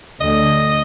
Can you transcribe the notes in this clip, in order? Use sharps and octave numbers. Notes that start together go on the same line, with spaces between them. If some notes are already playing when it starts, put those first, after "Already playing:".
D2 D3 D#5